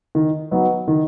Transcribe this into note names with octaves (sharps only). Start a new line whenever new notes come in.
D#3
F#3 B3 D#4
D#3